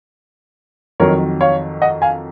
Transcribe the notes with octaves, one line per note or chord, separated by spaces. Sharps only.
F2 D#3 F#3 A#4 C#5
C#5 F5
D#5 F#5
F5 G#5